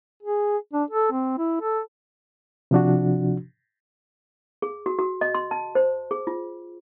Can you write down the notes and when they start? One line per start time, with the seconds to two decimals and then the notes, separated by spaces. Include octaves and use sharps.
0.23 G#4
0.73 D4
0.90 A4
1.12 C4
1.38 E4
1.61 A4
2.71 C3 F3 D4 F#4
4.62 G#4
4.86 F#4
4.99 F#4
5.21 D#5
5.34 C6
5.51 A5
5.75 C5
6.11 G#4
6.27 F4